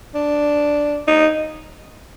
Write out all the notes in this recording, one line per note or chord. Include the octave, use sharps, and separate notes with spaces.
D4
D#4